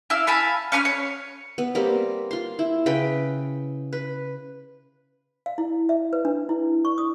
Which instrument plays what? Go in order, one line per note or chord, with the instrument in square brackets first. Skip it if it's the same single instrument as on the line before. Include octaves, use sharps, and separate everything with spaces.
[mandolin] E4 F5 E6
F5 G#5 A5 B5
C#4 B4 B5 F6
C#5
[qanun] B3
G3 A#3 C4 A#4
F4 C6
E4
C#3 B4 G5
B4
[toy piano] F5
E4
E5
B4
D4
E4
C#6
D#6